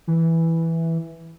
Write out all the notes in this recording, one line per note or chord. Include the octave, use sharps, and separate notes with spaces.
E3